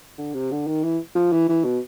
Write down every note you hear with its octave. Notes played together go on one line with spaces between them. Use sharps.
D3
C3
D3
D#3
E3
F3
E3
E3
B2